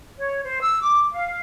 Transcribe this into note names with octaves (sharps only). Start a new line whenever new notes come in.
C#5
C5
E6
D6
F5